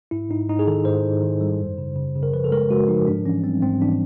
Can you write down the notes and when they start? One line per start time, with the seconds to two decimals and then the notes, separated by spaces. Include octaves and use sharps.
0.11 G#2 E4
0.30 G#2 D#4
0.49 G#2 D#4
0.59 G#4
0.67 D#3 A4
0.85 G#2 C5
1.04 G#2
1.22 D#3
1.41 G3
1.60 F#2
1.78 C#3
1.96 C#3
2.15 C#3
2.23 A#4
2.33 F3 B4
2.44 A4
2.51 G#3 A#4
2.70 G#3 F#4
2.88 F3 D#4
3.07 G#2 D4
3.25 E3 C#4
3.44 G3 C4
3.62 G#2 C4
3.81 E3 D4